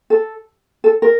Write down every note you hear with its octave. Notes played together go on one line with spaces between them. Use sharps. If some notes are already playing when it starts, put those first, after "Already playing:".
A4
A4
A#4